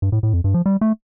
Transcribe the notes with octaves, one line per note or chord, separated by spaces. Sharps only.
G2
A2
A2
F2
G2
F3
G3
A3